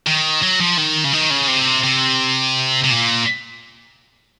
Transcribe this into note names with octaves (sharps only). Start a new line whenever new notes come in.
D#3
F#3
F3
D#3
C#3
D#3
C#3
C3
C3
C3
A#2